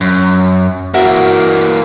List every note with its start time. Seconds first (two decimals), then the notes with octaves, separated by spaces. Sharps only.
0.01 F#2
0.94 E3 A#3 F#4 E5